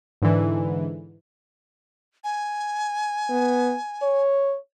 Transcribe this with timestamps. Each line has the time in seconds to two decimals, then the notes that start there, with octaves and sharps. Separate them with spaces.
0.22 G#2 D3 E3
2.24 G#5
3.30 B3
4.02 C#5